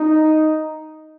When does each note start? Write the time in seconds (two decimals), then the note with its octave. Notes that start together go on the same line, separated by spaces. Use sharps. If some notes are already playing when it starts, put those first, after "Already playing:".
Already playing: D#4